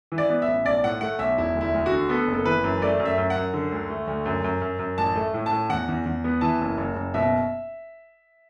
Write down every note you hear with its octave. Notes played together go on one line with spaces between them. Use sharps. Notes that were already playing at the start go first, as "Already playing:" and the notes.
E3
D5
B3
E5
A1
B1 D5
A2 F#5
A3 F#5
B1 E5
E1 E4
D2
E4
D2
F#4
D3
B3 A4
F#1
A4
E3 B4
F#2
A3 D5
F#2
E5
F#2
F#5
F#2
D3
D2
A3
D2
F#2
F#2
F#2
F#2
A1 A5
A3
A2
A5
A2
E2 F#5
E2
E2
B3
E3 A5
F#1
F#1
F#1
B2 E5